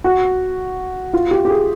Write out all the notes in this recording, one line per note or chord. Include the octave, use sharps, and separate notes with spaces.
F#4
F4
G4
G4
G#4